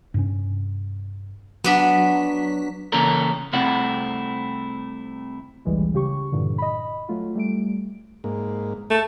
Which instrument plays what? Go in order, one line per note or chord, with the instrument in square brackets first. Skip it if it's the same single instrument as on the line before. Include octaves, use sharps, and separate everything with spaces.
[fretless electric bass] G2 C3 C#4
[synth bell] F#3 B6 [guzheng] B3 D4
[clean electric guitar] C#3 E3 A#3 C#4 A4 A#4
C2 C3 A3 C4 E4 F#5
[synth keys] A1 D2 E3 G3 G#3
C#3 G4 C#6
G2 A#2 D3 E3
D#5 B5
F#3 A3 F4
G3 A3 D7
[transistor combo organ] G#2 A#3
[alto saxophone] A3 [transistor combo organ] A5